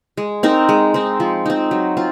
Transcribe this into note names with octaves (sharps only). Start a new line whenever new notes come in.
G#3
C4 D#4 A#4
G#3
C4 D#4
F3
C4 D#4
F#3
C4 F4